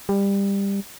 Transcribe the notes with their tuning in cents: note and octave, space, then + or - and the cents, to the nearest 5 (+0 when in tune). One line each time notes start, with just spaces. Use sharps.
G3 +20